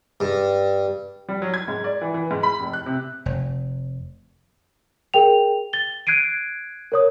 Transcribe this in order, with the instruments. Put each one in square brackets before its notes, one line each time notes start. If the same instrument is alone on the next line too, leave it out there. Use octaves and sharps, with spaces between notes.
[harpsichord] G2
[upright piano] G3
F#3
G#6
G#2
D5
E3
E3
G#2
B5
F1
F#6
C3
[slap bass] F1
[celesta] G#4 A#4 G5 F7
A6 G7
F#6 G#6 C7 D7 D#7
A#4 C#5 D#6